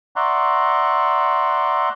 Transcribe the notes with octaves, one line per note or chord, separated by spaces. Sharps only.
D5 E5 F#5 A#5 C6 C#6